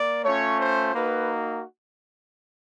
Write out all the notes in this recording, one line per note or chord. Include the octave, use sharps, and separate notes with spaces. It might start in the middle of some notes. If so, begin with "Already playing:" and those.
Already playing: A#3 D5
A3 C#4 F4 C#5
C5
A#3 D#4 F#4 B4